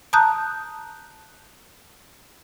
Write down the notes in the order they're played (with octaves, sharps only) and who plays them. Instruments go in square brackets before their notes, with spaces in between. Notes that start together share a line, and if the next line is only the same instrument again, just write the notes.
[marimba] A5 A#5 D#6 F#6 G6